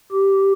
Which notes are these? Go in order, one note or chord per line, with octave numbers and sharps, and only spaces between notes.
G4